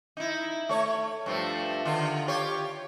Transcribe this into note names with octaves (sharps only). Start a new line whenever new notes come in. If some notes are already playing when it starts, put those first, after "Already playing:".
D#4 E4
A3 C#5
G2 F3 A3
D3 D#3 F4
F4 G4 C#5